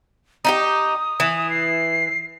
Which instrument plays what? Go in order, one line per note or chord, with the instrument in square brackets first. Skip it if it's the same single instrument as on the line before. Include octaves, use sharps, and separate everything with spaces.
[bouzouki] D#4 E4 G4 [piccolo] D#6
[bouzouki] E3
[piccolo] C7